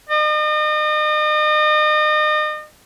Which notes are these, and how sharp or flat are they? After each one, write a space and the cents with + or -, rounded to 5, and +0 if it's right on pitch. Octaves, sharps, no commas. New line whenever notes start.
D#5 -40